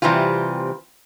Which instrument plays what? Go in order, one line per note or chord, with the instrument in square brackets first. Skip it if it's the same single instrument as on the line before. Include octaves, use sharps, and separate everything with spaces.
[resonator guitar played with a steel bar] C3 E3 G3 C4 F4